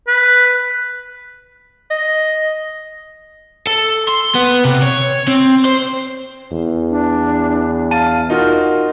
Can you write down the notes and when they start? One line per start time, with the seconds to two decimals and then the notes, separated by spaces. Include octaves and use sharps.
0.08 B4
1.91 D#5
3.67 A4
4.08 C6
4.35 B3
4.65 C3
4.83 C#5
5.28 C4
5.65 C5
6.52 E2
6.90 D4
7.91 F5 A5 A6 D#7
8.30 D#4 F4 F#4 A#4